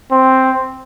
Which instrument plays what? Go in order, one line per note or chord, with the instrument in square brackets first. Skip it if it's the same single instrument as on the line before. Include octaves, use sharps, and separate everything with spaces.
[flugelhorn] C4